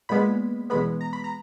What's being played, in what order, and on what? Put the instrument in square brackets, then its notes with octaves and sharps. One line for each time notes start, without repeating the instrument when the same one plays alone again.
[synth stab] A#2 G#3 B3 B5
E2 B2 G#3 B3 B5
A#5
B5
A#5